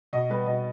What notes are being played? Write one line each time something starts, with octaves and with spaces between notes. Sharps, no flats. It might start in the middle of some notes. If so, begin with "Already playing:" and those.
B2 D#5
G3 B4
B2 D#5